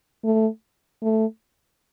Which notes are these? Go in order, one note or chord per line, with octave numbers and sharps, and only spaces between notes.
A3
A3